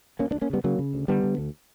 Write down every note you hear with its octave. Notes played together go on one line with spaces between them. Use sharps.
D2 A#3 C#4
B3 D4
D2
A#3 C#4
C#3 G3 B3
C#3 F#3 A#3
C#3
D2
D3 G3 B3
D3
D2